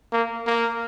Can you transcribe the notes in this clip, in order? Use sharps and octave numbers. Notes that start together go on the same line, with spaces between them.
A#3
A#3